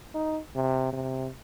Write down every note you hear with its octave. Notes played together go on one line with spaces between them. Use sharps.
D#4
C3
C3